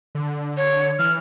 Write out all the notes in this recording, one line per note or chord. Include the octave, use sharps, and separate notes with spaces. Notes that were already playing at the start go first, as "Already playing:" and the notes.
D3
C#5
E3 F6